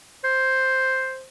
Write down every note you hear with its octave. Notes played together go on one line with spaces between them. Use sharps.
C5